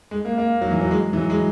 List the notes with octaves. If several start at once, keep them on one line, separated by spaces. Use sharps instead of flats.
G#3
A#3
A#3
F#3
E3
F#3
G#3
E3
F#3
G#3